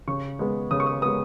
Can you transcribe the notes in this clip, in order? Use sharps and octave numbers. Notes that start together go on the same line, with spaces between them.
C#3 C#6
G#3 B3
C#3 D#6
C#6
D#6
G#3 B3 D#6